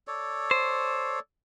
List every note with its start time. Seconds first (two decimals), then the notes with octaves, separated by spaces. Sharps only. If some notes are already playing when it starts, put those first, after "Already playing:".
0.07 A4 C#5 D5
0.51 C5